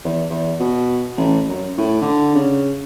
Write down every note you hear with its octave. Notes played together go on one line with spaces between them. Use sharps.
E2
E2
B2
A1
F#2
A2
D3
C#3